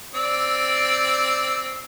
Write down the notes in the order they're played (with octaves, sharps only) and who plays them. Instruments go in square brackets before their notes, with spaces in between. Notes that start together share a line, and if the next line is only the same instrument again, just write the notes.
[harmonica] C4 D5 E6